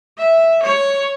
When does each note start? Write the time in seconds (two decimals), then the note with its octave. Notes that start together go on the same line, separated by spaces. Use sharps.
0.18 E5
0.63 C#5